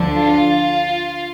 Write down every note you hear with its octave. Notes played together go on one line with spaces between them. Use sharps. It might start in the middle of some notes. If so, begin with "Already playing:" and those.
Already playing: D2 D3 F3 D4
F4